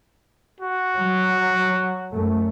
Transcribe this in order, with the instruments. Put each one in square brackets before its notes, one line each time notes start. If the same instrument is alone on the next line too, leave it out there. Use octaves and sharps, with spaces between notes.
[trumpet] F#4
[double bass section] F#3
F#2 A3